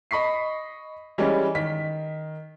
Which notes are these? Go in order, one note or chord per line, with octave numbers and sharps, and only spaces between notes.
D#5 B5 C#6 B6 C7
E3 G3 G#3 C#4
D#3 B6